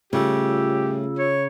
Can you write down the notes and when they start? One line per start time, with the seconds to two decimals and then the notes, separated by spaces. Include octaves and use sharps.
0.13 A2 C#3 G3 F4 G4 E6
1.19 C#5